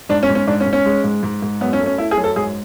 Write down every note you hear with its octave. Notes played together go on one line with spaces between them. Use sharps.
G#2 D4
C#4
G#2
C#4
G#2 D4
C#4
G#2
C#4
G#3
G#2
G#2
G#2
F#2 B3
C#4
A3
C#4
A3 E4
G#4
F#2
A4
G#2 G#4